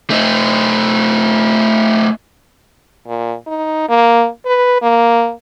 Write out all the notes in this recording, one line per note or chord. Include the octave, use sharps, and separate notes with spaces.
A3 D#4
A#2
D#4
A#3
B4
A#3